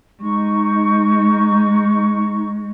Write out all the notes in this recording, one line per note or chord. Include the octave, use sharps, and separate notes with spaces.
G#3 D#4 C#6